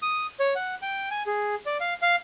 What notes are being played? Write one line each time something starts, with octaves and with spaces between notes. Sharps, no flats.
D#6
C#5
F#5
G5
G#5
G#4
D5
F5
F5